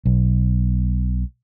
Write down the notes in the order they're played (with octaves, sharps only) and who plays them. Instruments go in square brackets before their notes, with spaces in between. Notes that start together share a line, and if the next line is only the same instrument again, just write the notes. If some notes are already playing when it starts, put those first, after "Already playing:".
[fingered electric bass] B1